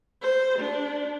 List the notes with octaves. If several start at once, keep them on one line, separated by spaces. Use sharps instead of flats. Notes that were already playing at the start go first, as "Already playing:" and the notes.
C5
D4